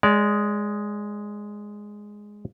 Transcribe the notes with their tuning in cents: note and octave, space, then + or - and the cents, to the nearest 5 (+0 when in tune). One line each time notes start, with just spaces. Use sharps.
G#3 +0 D5 -25